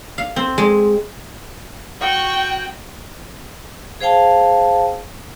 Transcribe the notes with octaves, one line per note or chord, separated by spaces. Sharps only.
F5
C4
G#3
F#4 G5 C#6
G#4 C5 F5 G5 A5